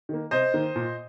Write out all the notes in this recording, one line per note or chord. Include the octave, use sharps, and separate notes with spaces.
D#3 A#3
C3 C5 D#5
D#3 A#3
A#2